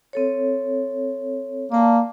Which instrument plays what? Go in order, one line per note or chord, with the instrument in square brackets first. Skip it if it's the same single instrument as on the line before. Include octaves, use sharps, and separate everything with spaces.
[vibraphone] C4 A4 C#5
[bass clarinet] A#3 [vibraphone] D5 A5